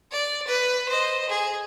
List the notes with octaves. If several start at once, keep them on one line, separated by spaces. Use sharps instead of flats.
D5
B4
C5 D#5
G#4